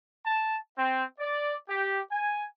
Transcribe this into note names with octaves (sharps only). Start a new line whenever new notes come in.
A5
C4
D5
G4
G#5